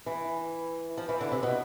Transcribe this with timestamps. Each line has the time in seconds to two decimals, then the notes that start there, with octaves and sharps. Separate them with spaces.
0.06 E3
0.98 F3
1.09 E3
1.21 D3
1.32 C3
1.43 B2